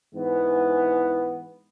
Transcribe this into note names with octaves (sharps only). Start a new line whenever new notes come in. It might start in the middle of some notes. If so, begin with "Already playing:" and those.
G#2 E3 B3